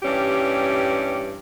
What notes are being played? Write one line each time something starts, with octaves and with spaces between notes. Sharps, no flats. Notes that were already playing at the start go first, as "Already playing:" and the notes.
G2 E3 G3 C#4 G4